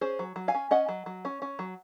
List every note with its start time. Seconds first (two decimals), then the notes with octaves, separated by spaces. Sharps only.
0.01 C#4 G#4 C5
0.19 F#3
0.36 F#3
0.48 F5 G#5
0.54 C#4
0.71 C#4 D#5 F#5
0.89 F#3
1.06 F#3
1.25 C#4
1.42 C#4
1.59 F#3